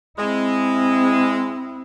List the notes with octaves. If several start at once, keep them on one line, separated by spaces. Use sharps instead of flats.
G#3 C4 E4